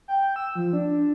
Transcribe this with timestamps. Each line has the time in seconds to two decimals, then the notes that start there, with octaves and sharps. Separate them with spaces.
0.08 G5
0.36 E6
0.56 F3
0.73 D4